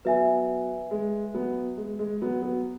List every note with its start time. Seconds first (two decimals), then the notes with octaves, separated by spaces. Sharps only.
0.05 F#3 B3 B4 E5 G#5
0.91 G#3
1.34 F#3 B3
1.77 G#3
1.99 G#3
2.22 F#3 B3
2.42 F#3 B3